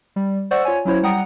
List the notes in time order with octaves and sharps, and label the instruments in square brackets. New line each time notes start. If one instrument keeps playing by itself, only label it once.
[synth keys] G3
C5 D5 F#5 C#6 E6
F4 C#5 G#5
F#3 C#4 E4 C5 C#5
G3 F#5 G5 A#5 D#6 C#7